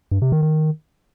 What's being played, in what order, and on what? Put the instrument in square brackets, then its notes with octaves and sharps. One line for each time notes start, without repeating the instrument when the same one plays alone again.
[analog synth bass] G2
C3
D#3
D#3